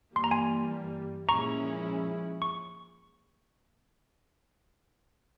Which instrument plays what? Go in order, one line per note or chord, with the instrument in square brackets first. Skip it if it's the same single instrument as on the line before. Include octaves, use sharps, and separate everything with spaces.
[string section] G2 E3 G3 A#3 [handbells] C6
[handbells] A#5
G#5 C6
[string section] A#2 F3 G#3 C#4 E4 [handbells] A#5 C#6
[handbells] C#6